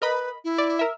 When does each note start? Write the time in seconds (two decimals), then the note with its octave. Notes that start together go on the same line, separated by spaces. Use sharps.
0.02 A#4 B4 D#5 B5
0.44 E4
0.58 D5
0.79 A#4 E5